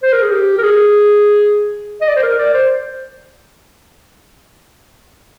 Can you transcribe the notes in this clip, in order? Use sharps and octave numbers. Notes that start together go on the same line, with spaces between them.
C5
A#4
G#4
G4
A#4
G#4
D#5
D5
C5
A#4
D5
C5